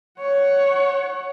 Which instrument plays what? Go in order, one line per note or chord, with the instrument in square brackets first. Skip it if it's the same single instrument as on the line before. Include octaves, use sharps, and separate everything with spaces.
[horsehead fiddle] C#5 F#5